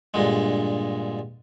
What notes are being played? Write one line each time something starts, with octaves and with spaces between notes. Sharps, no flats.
G2 A#2 D3 G#3